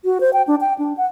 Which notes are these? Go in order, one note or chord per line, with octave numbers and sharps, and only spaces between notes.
F#4
C5
G5
D4
G5
D4
F#5